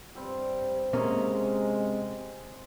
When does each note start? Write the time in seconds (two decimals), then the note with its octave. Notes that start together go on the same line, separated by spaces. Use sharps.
0.15 G2 G3 C4 G4
0.93 C3 G#3 A#3 C#4 C5 D#5 E5